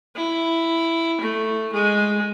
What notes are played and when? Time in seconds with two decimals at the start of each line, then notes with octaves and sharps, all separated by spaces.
0.16 E4
1.21 A3
1.73 G#3